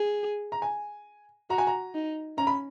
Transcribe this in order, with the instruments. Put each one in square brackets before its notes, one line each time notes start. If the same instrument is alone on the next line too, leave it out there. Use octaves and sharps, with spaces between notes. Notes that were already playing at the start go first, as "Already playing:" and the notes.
Already playing: [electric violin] G#4
[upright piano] A#5
G#5
[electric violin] F#4 [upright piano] A#5
[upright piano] G#5
A#5
[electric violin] D#4
[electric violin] C#4 [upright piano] A#5
[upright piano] B5